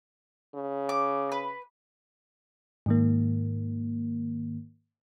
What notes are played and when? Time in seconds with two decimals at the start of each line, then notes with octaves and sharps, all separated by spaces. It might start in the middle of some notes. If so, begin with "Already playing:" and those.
0.55 C#3
0.89 D6
1.32 B4
2.86 G#2 D#3 A#3